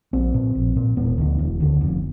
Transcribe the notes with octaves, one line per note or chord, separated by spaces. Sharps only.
A#1 C4
A#2
A#1
A#2
E1 B3
D2 D3
E1
D2 D3
F1